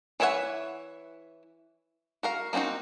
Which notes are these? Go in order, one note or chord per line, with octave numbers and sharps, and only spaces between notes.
E3 E4 C#5 E5 F#5
F#4 A#4 F5
A#3 C4 D4 D#4 F#4